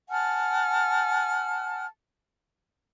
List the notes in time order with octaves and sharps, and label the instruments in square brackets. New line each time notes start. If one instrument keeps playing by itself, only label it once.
[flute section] F#5 G#5 A5 F6